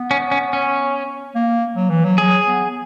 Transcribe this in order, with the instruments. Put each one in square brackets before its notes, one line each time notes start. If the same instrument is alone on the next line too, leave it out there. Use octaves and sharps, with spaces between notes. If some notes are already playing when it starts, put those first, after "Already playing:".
Already playing: [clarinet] B3
[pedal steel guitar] C#4
C#4
C#4
[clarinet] A#3
F#3
E3
F#3
[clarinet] F#3 [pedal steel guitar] G#4
[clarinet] B3